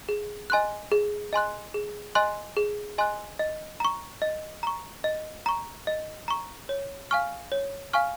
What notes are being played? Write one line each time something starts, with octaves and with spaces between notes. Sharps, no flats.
G#4
D#5 G#5 C6 F#6
G#4
D#5 G#5 C6 F#6
G#4
D#5 G#5 C6 F#6
G#4
D#5 G#5 C6 F#6
D#5
A#5 C#6
D#5
A#5 C#6
D#5
A#5 C#6
D#5
A#5 C#6
C#5
F5 G#5 C#6 F6
C#5
F5 G#5 C#6 F6